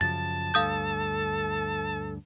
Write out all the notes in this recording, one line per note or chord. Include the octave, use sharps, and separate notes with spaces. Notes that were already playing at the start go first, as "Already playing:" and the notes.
F#2 C#3 F3 A5 A6
D2 G2 A4 F5 D#6 G6